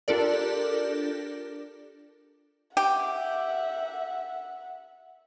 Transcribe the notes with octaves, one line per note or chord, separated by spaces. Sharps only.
D4 F4 G4 A4 A#4 D5
G4 E5 F#5